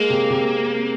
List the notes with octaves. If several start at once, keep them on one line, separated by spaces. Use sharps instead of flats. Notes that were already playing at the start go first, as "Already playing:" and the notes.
Already playing: G#3 A#3
C3
C3